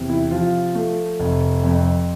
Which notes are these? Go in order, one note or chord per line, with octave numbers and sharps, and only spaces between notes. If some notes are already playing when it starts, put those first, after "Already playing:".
Already playing: E2 C3
E4
F3 F4
A3
F1
F2